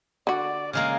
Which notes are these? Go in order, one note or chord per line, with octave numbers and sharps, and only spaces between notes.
D3 F#4 D5
C#3 G#3 A#3 F6